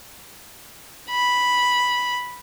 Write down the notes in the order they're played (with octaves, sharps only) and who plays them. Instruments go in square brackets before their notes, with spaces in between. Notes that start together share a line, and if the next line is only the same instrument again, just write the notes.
[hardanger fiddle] B5